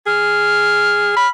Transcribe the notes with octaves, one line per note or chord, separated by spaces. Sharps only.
G#4 F6
B5